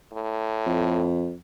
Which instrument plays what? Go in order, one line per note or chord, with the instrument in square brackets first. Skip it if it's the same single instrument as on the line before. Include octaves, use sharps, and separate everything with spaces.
[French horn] A2
[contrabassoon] F2